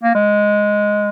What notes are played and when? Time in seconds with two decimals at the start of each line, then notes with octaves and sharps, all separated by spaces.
0.03 A#3
0.15 G#3